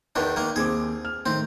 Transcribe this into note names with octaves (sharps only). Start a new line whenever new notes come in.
E2 D#3 D4
D#3 A#3 F6
D#2 C4 G#4 D6
F6
A2 D#3 C4